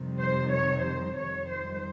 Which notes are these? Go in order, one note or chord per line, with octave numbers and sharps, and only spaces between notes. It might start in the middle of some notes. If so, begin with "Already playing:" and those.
Already playing: F2 C3 D#3 G3
C5
C#5
C5
F2 D#3 G3 C#5
C5